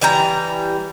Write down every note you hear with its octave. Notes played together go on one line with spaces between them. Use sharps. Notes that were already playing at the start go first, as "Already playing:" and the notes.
E3 G3 G5 A#5